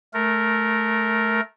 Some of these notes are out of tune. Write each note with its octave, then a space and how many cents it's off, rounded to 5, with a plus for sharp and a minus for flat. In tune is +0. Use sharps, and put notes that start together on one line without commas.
A3 -15 A#4 +0